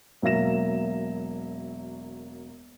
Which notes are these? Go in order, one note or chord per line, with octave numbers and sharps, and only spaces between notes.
E1 F#3 A#3 E5 A#6 E7